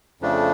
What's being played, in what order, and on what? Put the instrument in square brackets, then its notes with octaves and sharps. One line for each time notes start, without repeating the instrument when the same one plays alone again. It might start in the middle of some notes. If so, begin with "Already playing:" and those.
[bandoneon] F2 C#3 F3 A3 D4